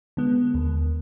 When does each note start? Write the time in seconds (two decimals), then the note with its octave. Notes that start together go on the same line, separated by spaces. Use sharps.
0.17 D3 G#3 B3
0.54 D#2